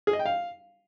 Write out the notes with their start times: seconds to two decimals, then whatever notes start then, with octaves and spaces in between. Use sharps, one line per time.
0.07 G#4
0.13 D#5
0.19 G5
0.26 F5